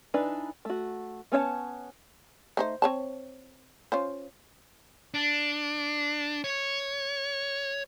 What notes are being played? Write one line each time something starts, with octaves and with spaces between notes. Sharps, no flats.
E3 D4 D#4 B4
A3 F#4
B3 C#4 C#5 E5 A5
A3 D#4 C5
C4 C#5 A5
C#4 F4 C5
D4
C#5